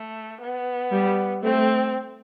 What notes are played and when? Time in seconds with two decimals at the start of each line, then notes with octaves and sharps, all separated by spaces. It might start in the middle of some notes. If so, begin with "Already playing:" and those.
Already playing: A3
0.41 B3
0.92 G3
1.43 A3 C4